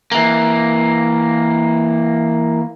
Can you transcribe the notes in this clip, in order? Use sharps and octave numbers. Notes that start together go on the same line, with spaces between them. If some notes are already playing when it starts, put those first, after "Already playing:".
E3 A#3